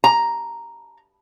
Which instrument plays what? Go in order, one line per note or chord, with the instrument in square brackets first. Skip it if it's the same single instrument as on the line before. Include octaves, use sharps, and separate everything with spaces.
[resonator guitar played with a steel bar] A#5